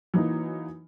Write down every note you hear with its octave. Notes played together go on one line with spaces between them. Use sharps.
E3 F#3 A#3 D#4